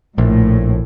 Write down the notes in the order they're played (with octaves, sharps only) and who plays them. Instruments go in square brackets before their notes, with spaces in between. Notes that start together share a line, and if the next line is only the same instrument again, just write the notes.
[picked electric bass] A#1 [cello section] A2